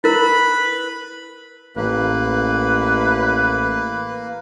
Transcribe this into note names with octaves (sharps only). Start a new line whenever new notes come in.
E4 A#4 B4 B5
A1 A#3 B4